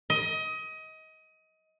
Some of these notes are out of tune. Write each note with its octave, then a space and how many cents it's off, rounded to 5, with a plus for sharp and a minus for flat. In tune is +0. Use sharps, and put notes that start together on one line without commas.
D#5 +25